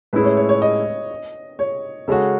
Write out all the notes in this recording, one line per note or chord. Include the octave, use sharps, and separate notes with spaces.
A2 G#3 C#4 E4 G#4 B4
C#5
C#5
C#5
D#5
C#5
C#3 G#3 C#4 F#4 A4